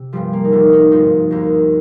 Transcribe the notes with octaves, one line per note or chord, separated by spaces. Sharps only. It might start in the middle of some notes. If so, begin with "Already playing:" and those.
Already playing: C3
G1 G2 F3 G3
A#3
D#4
F1 D#2 D3 F3 D4
D#4
G#1 G2 F3 D#4
D#2 D#3